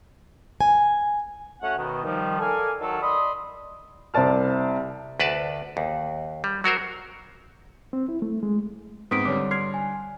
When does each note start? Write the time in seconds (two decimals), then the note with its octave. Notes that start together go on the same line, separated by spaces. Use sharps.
0.61 G#5
1.62 A3 C#4 F#4 C#5 F#5
1.77 B2 D#3
2.04 D#3 F3 G3
2.40 A4 A#4 D5 F5 G#5
2.81 D#3 F#3 A4
3.03 D5 D#5 B5 C6 D#6
4.14 C2 C4 D5 A5 F6
5.20 D2 B4 D5 A5
5.77 D#2
6.44 G3
6.64 F#3 F#4 A#4 C5
7.93 C4
8.09 E4
8.22 A3
8.43 G#3
9.11 G#2 B3 C4 D#6 B6 D7
9.25 D3 G3 C#5 D6
9.51 C6 F6 G#6 C7
9.74 G#5